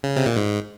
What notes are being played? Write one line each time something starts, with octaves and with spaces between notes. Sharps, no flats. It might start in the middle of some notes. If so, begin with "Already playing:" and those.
C#3
C3
A#2
G#2